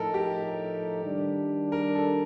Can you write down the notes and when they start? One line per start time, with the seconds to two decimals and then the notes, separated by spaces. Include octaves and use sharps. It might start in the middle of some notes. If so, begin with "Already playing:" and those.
Already playing: A2 F3 A3 D#4 A4 A#4
0.14 G4
1.04 D#3 G3 D4
1.72 A#4
1.95 A4